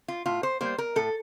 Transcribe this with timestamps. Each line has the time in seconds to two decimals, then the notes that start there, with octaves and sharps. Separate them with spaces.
0.08 F4
0.26 A2 F4
0.43 C5
0.61 G3 A#3 C5
0.78 A#4
0.96 A2 A4